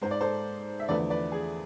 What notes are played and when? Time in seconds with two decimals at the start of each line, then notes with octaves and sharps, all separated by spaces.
0.01 G#2 G#3 C5
0.11 D5
0.21 A4 C5
0.79 E5
0.88 E2 D3 F3 A3 B4 D5
1.10 B4 D5
1.32 G#4